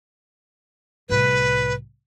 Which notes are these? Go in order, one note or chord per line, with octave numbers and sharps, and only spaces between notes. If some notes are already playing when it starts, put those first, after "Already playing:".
C2 A2 B4